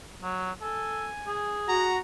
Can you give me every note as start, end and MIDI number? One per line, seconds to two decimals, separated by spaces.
0.22 0.52 54
0.62 1.08 69
0.62 1.58 80
1.27 1.90 68
1.68 1.99 66
1.68 2.00 82